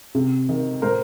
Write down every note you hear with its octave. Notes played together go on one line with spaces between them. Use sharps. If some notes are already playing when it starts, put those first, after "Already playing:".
C3
D#3
A2 A#4 C5